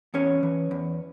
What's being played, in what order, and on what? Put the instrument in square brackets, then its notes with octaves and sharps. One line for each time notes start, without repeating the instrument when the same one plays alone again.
[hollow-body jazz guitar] E2 C#4 C#5
E3
E2